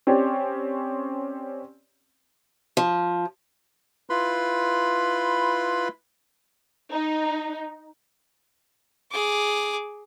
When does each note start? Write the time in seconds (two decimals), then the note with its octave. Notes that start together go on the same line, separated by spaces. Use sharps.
0.07 C4 C#4 G4 C#5 D5
2.77 F3
4.10 E4 F4 B4 B5 C6
6.92 D#4
9.11 G#4 D6